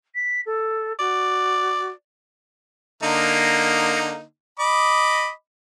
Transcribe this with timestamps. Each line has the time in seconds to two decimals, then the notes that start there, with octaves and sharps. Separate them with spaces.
0.14 B6
0.46 A4
0.99 F#4 D5
3.03 D3 A#3 D#4
4.60 D#5 B5 D6